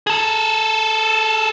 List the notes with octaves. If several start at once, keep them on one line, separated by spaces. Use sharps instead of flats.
G#4 A4